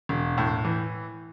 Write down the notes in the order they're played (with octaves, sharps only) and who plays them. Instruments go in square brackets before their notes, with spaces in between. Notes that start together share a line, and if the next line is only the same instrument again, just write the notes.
[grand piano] E1
A2
E3